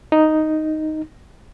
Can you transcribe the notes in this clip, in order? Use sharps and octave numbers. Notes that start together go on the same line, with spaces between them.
D#4